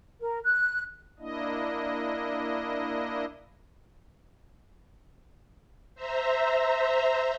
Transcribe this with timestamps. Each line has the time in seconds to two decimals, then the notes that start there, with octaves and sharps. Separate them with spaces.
0.20 A#4
0.44 F#6
1.20 A#3 D4 E4 D#5
5.95 C5 E5 A#5